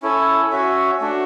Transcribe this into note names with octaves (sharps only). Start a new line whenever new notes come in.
C#4 E4 A4 C#5
C#4 F#4 C#5 E5
A3 D4 F#4